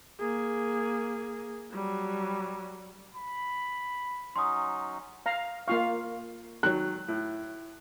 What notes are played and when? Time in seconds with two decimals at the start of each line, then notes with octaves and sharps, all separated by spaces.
0.20 A#3 G#4
1.73 F#3 G3
3.15 B5
4.36 F#3 C#4 D#4 C6 D#6
5.26 F5 A#5
5.68 A#3 F4 F5 C#6
6.63 D#3 F#3 F#6
7.08 A2